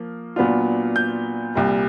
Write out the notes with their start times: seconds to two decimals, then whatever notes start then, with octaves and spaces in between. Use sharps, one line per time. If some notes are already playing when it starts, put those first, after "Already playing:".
Already playing: F3 A#3
0.36 A#2 F#3 B3 D4 F4
0.96 G6
1.55 C2 A#2 G3